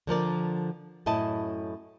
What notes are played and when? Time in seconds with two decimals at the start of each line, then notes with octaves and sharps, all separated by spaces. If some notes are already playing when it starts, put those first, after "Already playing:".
0.07 D3 F3 A#4 D5
1.06 F#2 A2 E4 D#5 A5